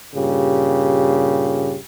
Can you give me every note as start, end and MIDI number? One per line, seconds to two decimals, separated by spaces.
0.14 1.77 43
0.14 1.77 46
0.14 1.77 49
0.14 1.77 67